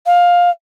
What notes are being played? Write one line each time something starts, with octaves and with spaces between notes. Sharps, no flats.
F5